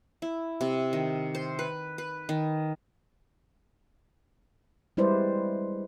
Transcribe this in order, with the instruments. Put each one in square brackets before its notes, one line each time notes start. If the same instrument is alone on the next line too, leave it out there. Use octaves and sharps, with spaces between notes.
[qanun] E4
C3
D#3
C5
B4
B4
D#3
[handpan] G3 G#3 E4 B4 C5 D5